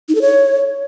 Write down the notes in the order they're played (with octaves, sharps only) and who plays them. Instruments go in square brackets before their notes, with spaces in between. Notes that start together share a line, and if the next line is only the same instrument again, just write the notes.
[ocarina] D#4
A4
C#5